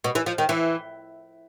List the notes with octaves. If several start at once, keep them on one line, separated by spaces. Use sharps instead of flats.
B2
E3
F3
D#3
E3